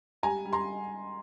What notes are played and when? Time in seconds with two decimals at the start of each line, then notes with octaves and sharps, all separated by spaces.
0.23 G3 G#5 A#5
0.45 G3
0.53 A#5 C6